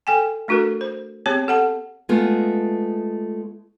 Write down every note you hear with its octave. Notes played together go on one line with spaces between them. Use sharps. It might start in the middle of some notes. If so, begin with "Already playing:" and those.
A4 G5 G#5
A3 D4 F#4 A4 A#4
C5
B3 C4 G4 G#4 C#5 A5
A4 F#5 A5
G#3 A3 B3 F4